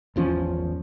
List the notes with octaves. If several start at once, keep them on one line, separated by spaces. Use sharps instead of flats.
G#1 E2 F3 C#4